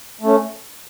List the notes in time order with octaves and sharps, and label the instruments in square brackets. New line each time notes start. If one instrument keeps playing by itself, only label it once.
[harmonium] A3 C#4